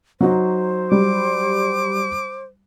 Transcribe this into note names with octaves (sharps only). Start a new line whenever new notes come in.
F#3 D#4 F#4 C5
G3 D6